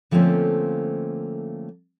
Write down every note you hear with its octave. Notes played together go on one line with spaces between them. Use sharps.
D3 F3 A3 A#3 C4 C#4